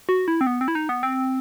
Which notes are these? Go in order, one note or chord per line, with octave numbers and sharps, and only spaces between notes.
F#4
E4
C4
B3
C4
E4
D#4
B3
C4